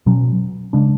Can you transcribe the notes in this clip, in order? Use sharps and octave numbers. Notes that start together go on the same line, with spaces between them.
B2 F#3 C#4
C#3 G#3 D4